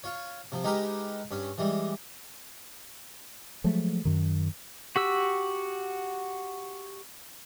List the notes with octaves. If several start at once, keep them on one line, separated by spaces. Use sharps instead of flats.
F4 C#5
C3 F3
G#3 D#4 G4 A#4 B4
G2 C#4
E3 G3 G#3
F3 F#3 G#3 A3
F#2 D#3
F#4 G4 E6